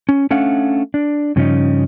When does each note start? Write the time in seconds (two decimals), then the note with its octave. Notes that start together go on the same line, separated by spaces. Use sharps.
0.09 C#4
0.31 A3 C#4 D4 F5 F#5
0.94 D4
1.36 G2 C#3 F3 C4 C#4 D#4